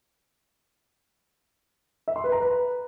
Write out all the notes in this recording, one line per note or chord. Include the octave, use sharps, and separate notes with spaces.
E5
C6
B4
A#5
B4